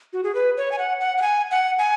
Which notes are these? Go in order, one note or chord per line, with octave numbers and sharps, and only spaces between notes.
F#4
G#4
B4
C#5
G#5
F#5
F#5
F#5
G#5
F#5
G#5